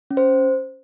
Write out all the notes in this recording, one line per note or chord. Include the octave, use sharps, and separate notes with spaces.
C#4
C5